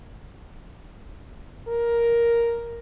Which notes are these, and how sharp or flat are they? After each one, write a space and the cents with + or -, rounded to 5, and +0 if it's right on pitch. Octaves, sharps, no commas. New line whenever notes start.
A#4 +5